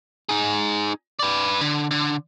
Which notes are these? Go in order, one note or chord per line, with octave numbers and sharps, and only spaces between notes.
D#4 G#4
B4 D5
D3
D3